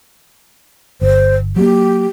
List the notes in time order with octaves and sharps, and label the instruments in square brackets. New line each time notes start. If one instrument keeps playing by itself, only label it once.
[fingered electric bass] G1 [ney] C5
[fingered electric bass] F#3 A3 A#3 [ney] G4